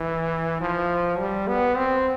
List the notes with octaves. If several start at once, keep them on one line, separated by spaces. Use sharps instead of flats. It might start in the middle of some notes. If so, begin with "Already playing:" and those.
Already playing: E3
F3
G3
B3
C4